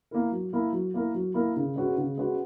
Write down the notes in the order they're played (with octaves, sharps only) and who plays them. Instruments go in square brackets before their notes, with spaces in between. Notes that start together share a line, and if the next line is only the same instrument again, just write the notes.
[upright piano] A#3 E4 A#4
F#3
A#3 E4 A#4
F#3
A#3 E4 A#4
F#3
A#3 E4 A#4
C#3
G#3 C#4 F#4 B4
C#3
G#3 C#4 F#4 B4